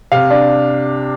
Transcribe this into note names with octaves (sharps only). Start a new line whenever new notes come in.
C3 F5
D4